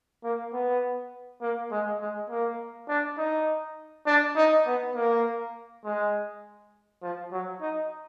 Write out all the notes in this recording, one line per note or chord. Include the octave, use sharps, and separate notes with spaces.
A#3
B3
A#3
G#3
G#3
A#3
D4
D#4
D4
D#4
B3
A#3
G#3
F3
F#3
D#4